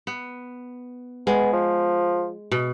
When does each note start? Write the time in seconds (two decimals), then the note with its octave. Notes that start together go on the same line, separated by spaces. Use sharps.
0.07 B3
1.27 G#3 B3
1.53 F3
2.51 B2